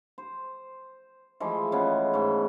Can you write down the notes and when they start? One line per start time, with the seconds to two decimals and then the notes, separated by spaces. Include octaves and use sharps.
0.18 C5
1.40 E3 F3 G#3 A3
1.72 C#3 B3
2.14 G#2 A3